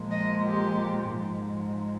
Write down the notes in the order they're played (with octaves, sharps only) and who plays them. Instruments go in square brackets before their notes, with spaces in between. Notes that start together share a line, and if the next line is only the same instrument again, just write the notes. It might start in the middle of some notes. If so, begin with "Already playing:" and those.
Already playing: [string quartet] A#2 F3 G#3
D#5
G4
G#2 F3 G#3